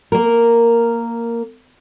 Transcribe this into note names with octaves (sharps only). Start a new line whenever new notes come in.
A#3 A#4